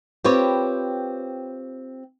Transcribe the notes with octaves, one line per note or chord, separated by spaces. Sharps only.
C4 F4 G4 B4 C#5